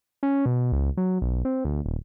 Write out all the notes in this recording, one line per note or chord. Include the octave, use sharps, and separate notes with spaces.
C#4
B2
C#2
F#3
B1
C4
D2
D#1